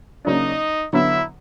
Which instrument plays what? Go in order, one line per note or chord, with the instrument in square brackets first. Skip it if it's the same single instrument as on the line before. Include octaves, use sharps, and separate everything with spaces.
[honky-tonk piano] C#3 F#3 A#3 D4 [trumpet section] D#4 D#5
[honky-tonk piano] D3 F#3 B3 [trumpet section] E4 E5